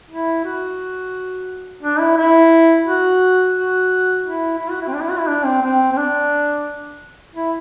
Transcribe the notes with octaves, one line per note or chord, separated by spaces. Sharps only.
E4
F#4
D4
E4
E4
F#4
F#4
E4
E4
F#4
E4
C4
D4
E4
F#4
E4
D4
C4
C4
C4
D4
E4